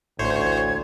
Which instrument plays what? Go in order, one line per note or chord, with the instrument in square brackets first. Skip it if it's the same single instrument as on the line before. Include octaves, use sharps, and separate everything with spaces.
[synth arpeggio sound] A1 A2 A3 [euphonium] D2 [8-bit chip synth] C5 C#5 [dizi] G#6